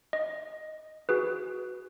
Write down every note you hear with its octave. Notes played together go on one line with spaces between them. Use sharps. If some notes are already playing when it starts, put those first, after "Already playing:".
D#5
F#4 G#4 B4